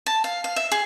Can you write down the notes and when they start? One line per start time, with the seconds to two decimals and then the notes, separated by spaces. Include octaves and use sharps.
0.06 A5
0.24 F5
0.44 F5
0.56 E5
0.72 G#4